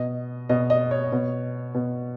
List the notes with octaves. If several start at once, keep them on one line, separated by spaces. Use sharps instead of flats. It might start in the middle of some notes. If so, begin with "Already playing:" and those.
Already playing: B2 D#5
B2 D#5
D#5
C#5
B2
B2